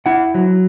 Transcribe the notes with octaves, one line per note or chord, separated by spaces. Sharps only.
E4 F#5
F#3